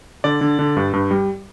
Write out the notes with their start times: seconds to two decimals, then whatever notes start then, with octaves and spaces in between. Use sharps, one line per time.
0.24 D3 D5
0.41 D3
0.59 D3
0.77 G2
0.93 G2
1.11 G3